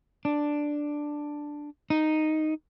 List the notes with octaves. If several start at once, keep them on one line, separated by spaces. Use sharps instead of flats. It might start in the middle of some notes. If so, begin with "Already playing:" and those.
D4
D#4